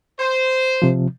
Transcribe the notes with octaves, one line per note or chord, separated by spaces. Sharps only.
C5
C3 F3